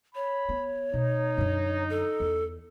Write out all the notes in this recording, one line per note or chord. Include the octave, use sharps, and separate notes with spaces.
C#5 B5
B3
B2 D#4
F#2 D3
A4
E2